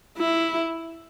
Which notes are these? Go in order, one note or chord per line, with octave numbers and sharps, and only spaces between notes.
E4